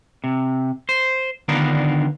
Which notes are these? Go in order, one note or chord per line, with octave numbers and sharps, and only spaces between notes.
C3
C5
D3 D#3 B3 D4 F4 A#4